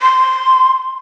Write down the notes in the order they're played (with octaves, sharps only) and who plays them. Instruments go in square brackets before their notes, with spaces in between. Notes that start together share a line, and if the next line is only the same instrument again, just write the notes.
[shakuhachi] C6